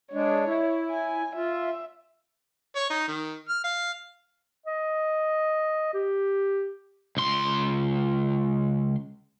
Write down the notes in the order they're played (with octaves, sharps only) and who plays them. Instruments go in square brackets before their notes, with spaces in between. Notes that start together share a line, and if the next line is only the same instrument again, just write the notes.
[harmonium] G#3 D4 [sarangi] C#5
[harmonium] E4
[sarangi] G#5
[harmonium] F4 [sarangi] E5
[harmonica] C#5
D#4
D#3
F6
F5
[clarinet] D#5
G4
[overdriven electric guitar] C#2 C6